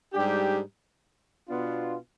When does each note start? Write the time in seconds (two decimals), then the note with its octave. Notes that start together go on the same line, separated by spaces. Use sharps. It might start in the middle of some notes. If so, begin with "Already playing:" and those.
0.13 G#2 G3 D4 G4
1.49 B2 B3 D4 F4